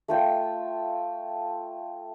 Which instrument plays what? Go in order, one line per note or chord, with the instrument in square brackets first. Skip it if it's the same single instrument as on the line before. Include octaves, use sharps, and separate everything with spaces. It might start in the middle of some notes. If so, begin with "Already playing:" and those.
[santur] A3 F4 G5